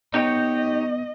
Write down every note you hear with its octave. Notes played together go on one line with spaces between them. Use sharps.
B3 D#4 G4 C#5 D#5